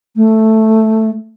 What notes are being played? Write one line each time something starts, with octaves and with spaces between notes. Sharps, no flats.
A3